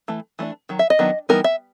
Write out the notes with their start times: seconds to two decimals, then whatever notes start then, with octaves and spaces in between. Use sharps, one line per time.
0.08 E3 A3
0.39 E3 A3 D4
0.69 D#3 F#3
0.79 E5
0.90 D#5
0.99 D#3 F#3 B3 D4
1.29 E3 G3 B3 D#4 A#4
1.44 E5